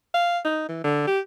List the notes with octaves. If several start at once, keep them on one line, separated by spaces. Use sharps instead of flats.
F5
D#4
E3
D3
G4